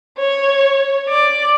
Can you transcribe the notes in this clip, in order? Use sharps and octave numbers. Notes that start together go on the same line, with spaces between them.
C#5
D5